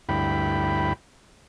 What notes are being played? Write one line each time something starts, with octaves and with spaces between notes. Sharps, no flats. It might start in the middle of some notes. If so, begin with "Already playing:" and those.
D2 G2 E4 G5 B5